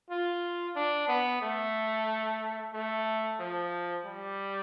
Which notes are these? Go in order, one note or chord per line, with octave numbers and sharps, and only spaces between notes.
F4
D4
B3
A3
A3
F3
G3